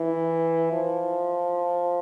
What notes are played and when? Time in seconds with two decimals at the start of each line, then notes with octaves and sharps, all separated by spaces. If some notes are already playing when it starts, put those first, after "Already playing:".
Already playing: E3
0.72 F3